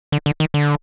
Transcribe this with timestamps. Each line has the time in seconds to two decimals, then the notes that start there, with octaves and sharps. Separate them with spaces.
0.12 D3
0.26 D3
0.40 D#3
0.54 D3